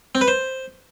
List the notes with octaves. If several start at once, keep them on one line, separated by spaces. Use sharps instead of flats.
C4
B4
C5